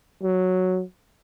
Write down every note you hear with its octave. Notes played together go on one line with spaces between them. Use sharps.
F#3